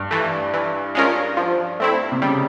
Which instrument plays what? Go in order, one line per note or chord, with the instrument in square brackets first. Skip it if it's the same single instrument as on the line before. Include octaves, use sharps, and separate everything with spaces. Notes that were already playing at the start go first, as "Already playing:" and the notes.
Already playing: [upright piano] G2
[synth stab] E3 A3
E3
G#3 C#4 F4 A#4
F3
A3 C4 E4
[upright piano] C3
[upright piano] C#3 [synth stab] G3